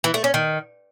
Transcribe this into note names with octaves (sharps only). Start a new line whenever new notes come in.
E3
A3
C#4
D#3